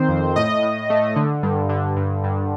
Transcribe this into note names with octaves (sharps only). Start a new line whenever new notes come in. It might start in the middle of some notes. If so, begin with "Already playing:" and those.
Already playing: D#3 C4 C5
F2
A2 D#5
A2
A3
D3
G2
D3
G2
G2